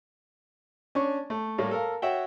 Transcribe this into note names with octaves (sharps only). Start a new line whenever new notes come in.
C#4 D4 C#6
A3
A2 G3 A3 A#3 C#5
A4 A#4 F5
F#4 C#5 E5 F#5 G5